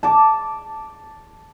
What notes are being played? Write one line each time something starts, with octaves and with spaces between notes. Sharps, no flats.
A5 D6